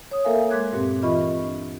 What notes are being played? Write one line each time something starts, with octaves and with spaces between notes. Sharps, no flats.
C#5 D#6
A#3 A4 A#4 E5 F5 G#5
G#3 C6 D6 F#6 G#6
G2 A#2 C4
E3 F4 D#5 B5 C#6
D4